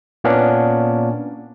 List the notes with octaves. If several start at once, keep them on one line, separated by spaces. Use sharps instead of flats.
A#2 A#3 B3 C#4 D4